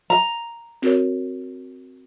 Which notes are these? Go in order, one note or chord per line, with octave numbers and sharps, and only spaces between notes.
A#5
C4 F#4 A#4 C#5